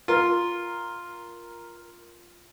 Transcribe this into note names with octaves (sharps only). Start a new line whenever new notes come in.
F4 A#4